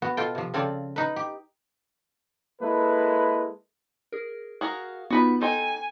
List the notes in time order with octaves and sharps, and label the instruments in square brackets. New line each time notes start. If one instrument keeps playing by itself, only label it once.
[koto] B3 F#4
B2 F4 A4 G5
C3 F3
C#3 C4 F4 A4 D5
D#4 B4
G4
[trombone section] G#3 A#3 E4 A4 B4
[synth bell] G#4 A#4
[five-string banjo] F#4 G#4 A#4 [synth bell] F5
[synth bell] B3 D#4 F4 [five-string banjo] F#4 B4 B5
[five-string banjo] D#4 C5 G5 [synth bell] A4 [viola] G#5